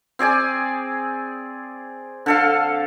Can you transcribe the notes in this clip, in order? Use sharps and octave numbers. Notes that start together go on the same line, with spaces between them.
C4 G#4 D5 G#5
D3 A4 F5